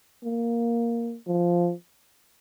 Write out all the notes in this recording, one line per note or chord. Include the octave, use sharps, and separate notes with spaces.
A#3
F3